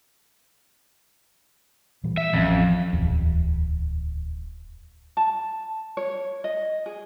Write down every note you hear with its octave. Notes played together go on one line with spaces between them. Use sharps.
A#2 E3 G3
E5
A1 F2 E3 C#4
D1 E2
A5
C#5
D#5
G#4